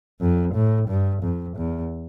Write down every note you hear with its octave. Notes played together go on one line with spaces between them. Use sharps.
F2
A2
G2
F2
E2